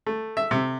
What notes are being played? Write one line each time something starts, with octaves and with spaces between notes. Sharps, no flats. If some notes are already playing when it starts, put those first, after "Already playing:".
A3
E5
C3